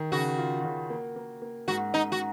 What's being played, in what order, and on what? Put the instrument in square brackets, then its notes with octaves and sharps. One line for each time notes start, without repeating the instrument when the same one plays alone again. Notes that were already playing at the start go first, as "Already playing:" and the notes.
Already playing: [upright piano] D#3
[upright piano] C#3 [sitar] F#4
[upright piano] F4
C#3
A#3
A#3
A#3
[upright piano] G#2 [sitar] F#4
[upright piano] G#2 [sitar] D#4
[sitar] F#4